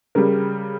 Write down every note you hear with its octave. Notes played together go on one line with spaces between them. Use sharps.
C#3 G3 A#4